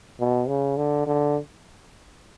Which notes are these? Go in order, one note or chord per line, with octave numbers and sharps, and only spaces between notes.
B2
C#3
D3
D3